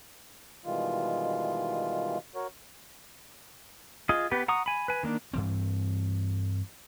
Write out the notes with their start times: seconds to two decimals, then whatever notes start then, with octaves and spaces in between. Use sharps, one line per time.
0.65 B2 D#3 E3 G3 G#3 F4
2.35 F#4 A#4 C#5
4.09 F4 G#4 D#5
4.31 B3 G4 B4
4.48 F#5 A#5 C#6 D#6
4.66 G#5 B5
4.88 B4 G#5
5.03 D#3 A#3 D4
5.33 G2 E3 C4